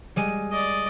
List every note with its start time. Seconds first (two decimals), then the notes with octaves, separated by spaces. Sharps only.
0.16 G3 G#3 D#7
0.52 D5 D#5